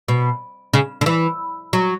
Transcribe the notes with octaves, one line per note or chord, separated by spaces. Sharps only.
B2
C#3
D3
E3
F#3